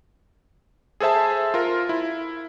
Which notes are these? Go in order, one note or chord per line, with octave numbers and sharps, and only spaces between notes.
G#4 A4 C5 E5 A5
F4 A#4
E4